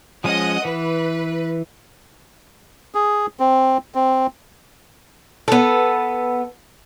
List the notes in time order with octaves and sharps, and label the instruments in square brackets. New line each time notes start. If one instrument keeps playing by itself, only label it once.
[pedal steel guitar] F3 G#3 C#4 [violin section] D#5 F#5 D#6
[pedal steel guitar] E3 [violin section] B4
[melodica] G#4
C4
C4
[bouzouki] B3 A4